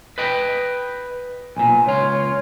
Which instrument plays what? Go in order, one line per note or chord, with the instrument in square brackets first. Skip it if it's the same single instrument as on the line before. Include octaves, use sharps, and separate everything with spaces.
[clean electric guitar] B4 D#5 G5
[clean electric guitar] B1 A#2 [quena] G#5
[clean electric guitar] C#2 F4 [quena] C#5